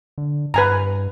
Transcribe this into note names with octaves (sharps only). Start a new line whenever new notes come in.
D3
G2 B4 G#5 A#5